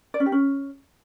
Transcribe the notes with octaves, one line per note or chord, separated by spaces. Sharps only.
D5
C#4
G4
C#4